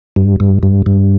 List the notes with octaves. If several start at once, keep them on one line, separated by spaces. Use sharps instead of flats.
G2
G2
G2
G2